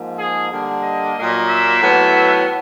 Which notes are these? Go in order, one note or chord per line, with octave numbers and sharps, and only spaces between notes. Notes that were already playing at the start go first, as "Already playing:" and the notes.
Already playing: G#2 F3 A#3
G#4
D3 G3 A#3
D#5
A#2 F#3 A#3
E5
A2 F#3 B3